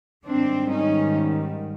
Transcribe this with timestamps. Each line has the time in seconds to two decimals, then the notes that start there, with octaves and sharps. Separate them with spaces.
0.25 G#2 D#3 G3 C4 D4
0.69 C#4 D#4